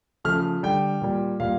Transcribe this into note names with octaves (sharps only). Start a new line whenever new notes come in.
C#3 F3 A3 F6
D3 G3 G5
A#2 G3
A#2 G3 F5